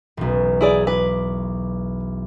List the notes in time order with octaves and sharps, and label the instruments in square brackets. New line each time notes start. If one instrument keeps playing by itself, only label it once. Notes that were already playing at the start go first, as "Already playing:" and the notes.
[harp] E1 B1
[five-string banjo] E4 G#4 D5
[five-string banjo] B4 [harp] D6